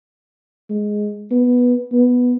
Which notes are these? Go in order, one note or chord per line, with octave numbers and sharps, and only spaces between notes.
G#3
B3
B3